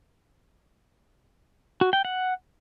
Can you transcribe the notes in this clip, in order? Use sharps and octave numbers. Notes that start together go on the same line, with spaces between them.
F#4
G5
F#5